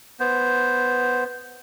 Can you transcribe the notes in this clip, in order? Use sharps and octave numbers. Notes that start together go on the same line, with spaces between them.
B3 C5